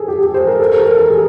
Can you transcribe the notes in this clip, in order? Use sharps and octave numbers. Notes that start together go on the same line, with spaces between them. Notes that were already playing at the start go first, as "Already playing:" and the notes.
Already playing: G#4 A4
G4
G4
C5
A#4
A4
A#4
A#4
A4
G#4